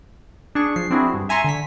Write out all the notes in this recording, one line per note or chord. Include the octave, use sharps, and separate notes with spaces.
D4 G#4 C#6
F3 C7
C4 D4 E4 F#4 G#4
G2
E5 G#5 A#5 C6 C#6
D3 B6